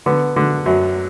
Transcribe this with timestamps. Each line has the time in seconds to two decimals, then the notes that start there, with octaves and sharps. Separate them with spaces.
0.06 D3 B3
0.36 D3
0.66 F#2